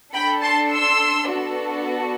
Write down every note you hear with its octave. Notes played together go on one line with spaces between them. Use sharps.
D4 A4 G5 B5
A5 C6
C6 E6
B3 D4 F#4 A4